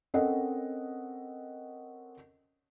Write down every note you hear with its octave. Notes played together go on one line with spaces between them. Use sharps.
C4 C#4 A4 A#4 D#5 F#5